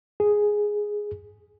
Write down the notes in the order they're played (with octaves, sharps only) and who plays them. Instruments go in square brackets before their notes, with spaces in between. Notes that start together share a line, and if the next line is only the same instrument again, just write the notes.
[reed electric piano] G#4